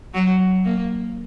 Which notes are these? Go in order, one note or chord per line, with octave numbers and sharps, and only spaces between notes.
F#3
A#3